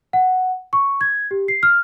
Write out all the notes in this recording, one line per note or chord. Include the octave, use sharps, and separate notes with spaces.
F#5
C#6
G#6
G4
C7
F6